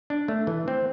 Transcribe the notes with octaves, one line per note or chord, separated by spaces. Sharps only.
D4
A3
E3
C4